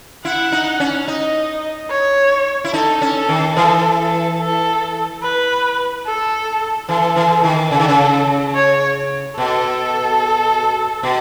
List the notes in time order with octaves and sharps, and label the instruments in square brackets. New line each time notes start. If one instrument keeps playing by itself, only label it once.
[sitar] E4 [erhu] F#5
[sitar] D#4
C#4
[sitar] D#4 [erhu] D#5
[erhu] C#5
[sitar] E4
[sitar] D#4 [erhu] A4
[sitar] C#4
[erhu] A4
[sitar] D#3
[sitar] E3 [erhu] A4
[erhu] A4
A4
B4
A4
[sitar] E3 [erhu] A4
[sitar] E3
D#3
[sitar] C#3 [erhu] A4
[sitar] D#3
C#3
[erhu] C#5
[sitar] B2 [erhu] A4
[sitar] B2